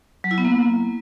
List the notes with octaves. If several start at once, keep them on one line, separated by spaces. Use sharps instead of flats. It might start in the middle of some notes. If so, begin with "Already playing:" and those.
F#3
E4
B3
A#3